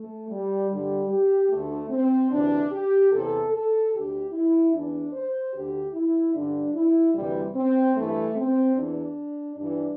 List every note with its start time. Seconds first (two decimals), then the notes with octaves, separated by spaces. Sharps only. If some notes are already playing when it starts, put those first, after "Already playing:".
Already playing: A3
0.29 G3
0.70 G2 D3 G3
1.10 G4
1.50 D2 D3 A3
1.90 C4
2.31 D2 C3 E3 D4
2.72 G4
3.11 E2 C3 E3 A4
3.52 A4
3.92 D2 D3 G4
4.32 E4
4.73 E2 E3 D4
5.13 C5
5.54 D2 D3 G4
5.94 E4
6.34 G2 D3 D4
6.74 E4
7.14 D2 C3 E3 G3
7.55 C4
7.95 G2 E3 A3
8.35 C4
8.75 E2 E3 D4
9.56 G2 E3 D4